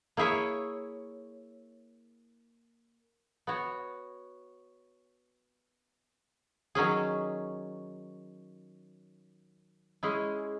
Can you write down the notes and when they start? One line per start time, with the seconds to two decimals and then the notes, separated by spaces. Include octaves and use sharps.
0.17 A#3 E4 G#4 C#5 E5
3.47 B3 F#4 C#5
6.75 D#3 F#3 C#4 G#4
10.03 G#3 C#4 E4 G#4